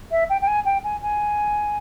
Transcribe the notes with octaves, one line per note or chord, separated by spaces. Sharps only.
E5
G5
G5
G#5
G5
G#5
G#5